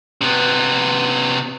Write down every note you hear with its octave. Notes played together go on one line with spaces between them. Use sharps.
C3 B3